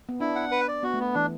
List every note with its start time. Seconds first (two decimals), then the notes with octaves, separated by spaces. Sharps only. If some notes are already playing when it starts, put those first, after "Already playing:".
0.09 B3
0.20 D4 E4
0.35 F#5
0.51 B4
0.68 D5
0.83 B3 F#4
0.94 A3
0.99 B3
1.14 E3 D4